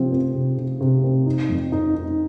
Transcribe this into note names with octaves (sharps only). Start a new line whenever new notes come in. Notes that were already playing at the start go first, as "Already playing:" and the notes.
Already playing: C3 F3 C4
C4
C3
C3
C3
C4
D#4
F2
D#4
D#4